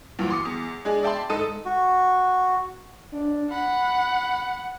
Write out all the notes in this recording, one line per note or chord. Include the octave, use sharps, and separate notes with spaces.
D2 G2 A#2 E3 F#3
C6 D6 D#6 C#7
E2
G#3 D4 G#4
D5 E5 G5 A5 B5 C6
G#2 G#3 A4 D#6 D#7
F#4
D4
F#5 B5